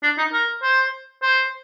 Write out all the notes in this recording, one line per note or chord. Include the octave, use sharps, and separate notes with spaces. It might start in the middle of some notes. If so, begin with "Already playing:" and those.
D4
D#4
A#4
C5
C5